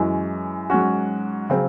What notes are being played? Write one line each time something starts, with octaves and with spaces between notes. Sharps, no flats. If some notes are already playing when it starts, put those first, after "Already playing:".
Already playing: F#2 E3 G#3 C#4
G#2 F#3 C#4 F#4
C#3 F#3 C4